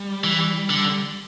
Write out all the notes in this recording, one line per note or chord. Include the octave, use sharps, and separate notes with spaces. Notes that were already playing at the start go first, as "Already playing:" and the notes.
Already playing: G3
E3
D3